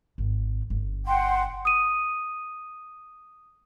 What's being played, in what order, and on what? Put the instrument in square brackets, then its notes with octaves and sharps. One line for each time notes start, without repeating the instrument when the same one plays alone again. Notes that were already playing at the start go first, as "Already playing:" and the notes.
[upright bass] G#1
G1
[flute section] F#5 G5 C6
[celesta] D#6 D#7